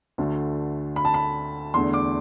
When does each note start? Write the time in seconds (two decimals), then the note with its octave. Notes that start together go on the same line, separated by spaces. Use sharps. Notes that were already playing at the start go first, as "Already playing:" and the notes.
0.18 D2 D3 A3
0.96 B5
1.05 A5
1.14 B5
1.74 E2 D3 A3 D4 C6
1.93 D6